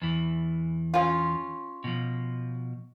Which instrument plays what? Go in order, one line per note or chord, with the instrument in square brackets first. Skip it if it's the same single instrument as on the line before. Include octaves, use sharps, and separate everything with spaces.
[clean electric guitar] E2 E3
[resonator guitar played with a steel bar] C#4 F4
[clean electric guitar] B2 F3